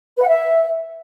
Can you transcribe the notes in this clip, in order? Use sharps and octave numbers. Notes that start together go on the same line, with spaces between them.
B4
F#5
E5